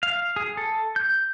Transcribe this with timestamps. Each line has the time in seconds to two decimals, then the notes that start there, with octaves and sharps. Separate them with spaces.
0.03 F5
0.36 G#4
0.57 A4
0.96 G6